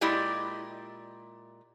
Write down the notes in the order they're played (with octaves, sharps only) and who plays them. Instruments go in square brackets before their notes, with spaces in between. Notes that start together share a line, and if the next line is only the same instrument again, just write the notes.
[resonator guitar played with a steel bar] A#2 G#3 E4 G4 D5 D#5